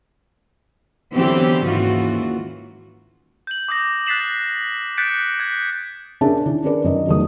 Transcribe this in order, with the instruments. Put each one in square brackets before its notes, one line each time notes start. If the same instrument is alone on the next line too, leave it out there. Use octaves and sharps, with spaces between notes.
[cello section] D3 E3 F#3 B3 C4 G4
D#2 G#2 C#3 E3 F4 F#4
[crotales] G6 F#7
D6 D#6 G6 A#6
F#6 A6 B6 C7 E7 F#7
F#6 G6 A6 B6 C#7 D7
F#6 G#6
[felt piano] C#4 D4 G#4 A#4 E5 A5
D#3 D4 E4
C#4 D4 G#4 A#4 B4 D5
F#2 D#3 D#5
E2 D#3 F#3 A3 F#4 D#6